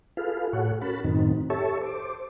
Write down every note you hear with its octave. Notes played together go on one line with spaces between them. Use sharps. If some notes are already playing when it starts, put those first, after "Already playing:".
F4 G#4 A4 B4 F5
A2 F#4 G#4 A4 C#5 F#5
C#4 F#4 A#4 A5 B5
F#2 A2 D#3 C4 D#4
G4 A4 C#5 E5 A5 C#6
C5 D6